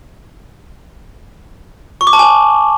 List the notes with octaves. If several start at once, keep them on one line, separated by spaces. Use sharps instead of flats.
C#6
D6
A5
G#5